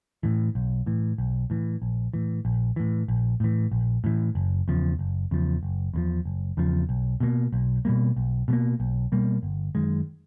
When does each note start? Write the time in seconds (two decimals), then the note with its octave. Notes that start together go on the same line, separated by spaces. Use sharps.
0.23 A2 E3
0.55 B1
0.86 A2 E3
1.18 B1
1.50 A2 E3
1.82 A#1
2.14 A2 E3
2.45 A#1
2.76 A2 E3
3.08 A#1
3.40 A2 E3
3.72 A#1
4.04 A2 E3
4.35 F#1
4.68 E2 C#3 F3
4.99 F#1
5.31 E2 C#3 F3
5.63 F#1
5.94 E2 C#3 F3
6.25 F#1
6.57 E2 C#3 F3
6.89 B1
7.20 B2 G3 A#3
7.52 B1
7.85 B2 G3 A#3
8.16 B1
8.48 B2 G3
8.53 A#3
8.80 B1
9.12 B2 G3 A#3
9.43 G1
9.75 F#2 D#3 G#3